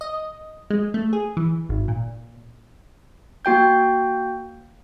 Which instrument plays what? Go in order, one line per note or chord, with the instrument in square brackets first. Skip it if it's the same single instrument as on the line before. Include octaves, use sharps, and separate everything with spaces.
[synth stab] D#5
G#3
A3
G#4
E3
G#1
A#2
[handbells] A#3 F#4 G5 G6